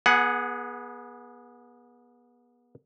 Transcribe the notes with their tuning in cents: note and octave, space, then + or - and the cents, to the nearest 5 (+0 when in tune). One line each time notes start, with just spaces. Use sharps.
B3 -30 G#4 +0 F#5 +0